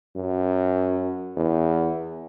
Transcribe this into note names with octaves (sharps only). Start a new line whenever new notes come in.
F#2
E2